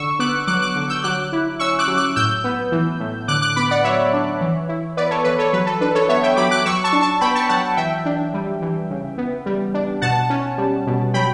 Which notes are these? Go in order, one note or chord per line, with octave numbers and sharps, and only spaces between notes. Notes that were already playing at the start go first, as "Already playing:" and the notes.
Already playing: D3 C#6 E6
B3 D6 F#6
F#3 D6 F#6
D6 F#6
D3
E6 G6
F#3 D6 F#6
E4
C#4 C#6 E6
D6 F#6
F#3
D6 F#6
A2 E6 G6
B3
E3
A2
D3 D6 F#6
D6 F#6
B3 B5 D6
D5 F#5
F#3 C#5 E5
D4
E3
E4
B3 B4 D5
A4 C#5
E3 B4
A4 C#5
F#3 B4
A4
D4 B4
A4 C#5
B3 C#5 E5
E5 G5
F#3 B5 D6
D6 F#6
F#3 C#6 E6
A5 C#6
D4
A5 C#6
B3 G5 B5
A5 C#6
F#3 F#5 A5
E3 E5 G5
D4
G3
E3
C#3
B3
G3
D4
B2 F#5 A5
C#4
G3
B2
F#3 G5 B5